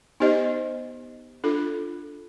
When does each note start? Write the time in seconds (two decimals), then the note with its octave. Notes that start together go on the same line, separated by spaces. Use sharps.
0.20 B3 D#4 G4 C5 D#5
1.44 D4 F4 A4